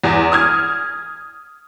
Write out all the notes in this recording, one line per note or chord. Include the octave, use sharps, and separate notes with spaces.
E2
D#6 F6 G#6